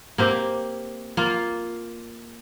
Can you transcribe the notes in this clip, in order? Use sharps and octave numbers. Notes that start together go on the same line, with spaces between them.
A#3 C4 G4
A#3 F4